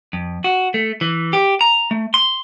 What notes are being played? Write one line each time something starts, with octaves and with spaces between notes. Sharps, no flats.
F2
F#4
A3
E3
G4
A#5
A3
C6